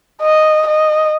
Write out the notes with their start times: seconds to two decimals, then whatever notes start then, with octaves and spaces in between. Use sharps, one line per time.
0.21 D#5
0.67 D#5